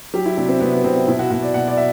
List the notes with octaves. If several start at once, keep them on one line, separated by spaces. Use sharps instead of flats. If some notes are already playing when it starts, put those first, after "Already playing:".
F#3 G4
E4
C3 D4
C4
C3 B3
B3
C3 C4
C4
B2 E4
F#4
B2 F#4
D5
B2 F#5
D5
E5